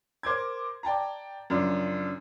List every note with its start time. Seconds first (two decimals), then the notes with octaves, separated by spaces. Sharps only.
0.23 A#4 C5 D6 G#6
0.83 D5 G5 A5 A#5
1.50 F#2 C#3 F3 D4